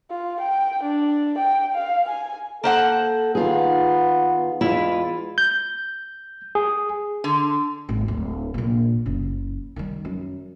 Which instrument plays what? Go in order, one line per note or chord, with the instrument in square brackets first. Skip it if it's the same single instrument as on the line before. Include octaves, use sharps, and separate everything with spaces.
[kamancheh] F4
G5
D4
G5
F5
G#5
[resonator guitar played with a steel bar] A#3 C5 F#5 [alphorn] A4
[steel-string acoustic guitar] D#3 F4 G#4 [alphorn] B3
[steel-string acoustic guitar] E2 F4 B4 [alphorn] G#3 [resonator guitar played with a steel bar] E4
[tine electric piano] G6
G#4
[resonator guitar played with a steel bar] D3
[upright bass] G#1
D1
A#1 A#2
F#1 C#3
D#3 G3
F#2